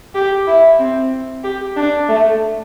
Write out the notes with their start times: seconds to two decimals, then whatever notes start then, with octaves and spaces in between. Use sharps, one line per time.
0.15 G4
0.47 E4
0.79 C4
1.44 G4
1.76 D4
2.09 A3